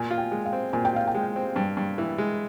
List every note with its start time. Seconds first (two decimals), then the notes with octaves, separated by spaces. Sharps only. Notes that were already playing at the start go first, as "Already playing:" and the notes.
Already playing: A#2 G#5
0.11 F4
0.18 G5
0.32 G#3
0.45 F5
0.53 C4
0.73 A#2 G#5
0.85 G5
0.94 F4 F5
1.07 G5
1.14 G#3
1.36 C4
1.56 G2
1.77 G2
1.98 E3
2.18 G#3